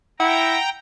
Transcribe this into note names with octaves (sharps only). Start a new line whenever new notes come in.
E4 F#5 G5 A#5